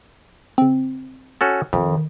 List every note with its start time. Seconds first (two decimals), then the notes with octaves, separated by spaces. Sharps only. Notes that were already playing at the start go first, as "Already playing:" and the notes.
0.58 C#3 C4
1.41 C#4 F#4 A4
1.73 F2 D#3